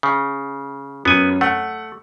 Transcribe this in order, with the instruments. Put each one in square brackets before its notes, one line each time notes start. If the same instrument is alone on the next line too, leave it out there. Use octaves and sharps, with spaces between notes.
[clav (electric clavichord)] C#3
[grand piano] F#2 [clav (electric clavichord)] B3 G#5
[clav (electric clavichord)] A3 [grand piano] F#5